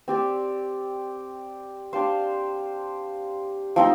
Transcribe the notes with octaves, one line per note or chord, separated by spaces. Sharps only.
C4 G4 D5
D4 G4 C5 F5
F3 C4 D#4